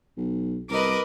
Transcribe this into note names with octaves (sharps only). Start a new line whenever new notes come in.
B1
C2 A#4 B4 D#5 D6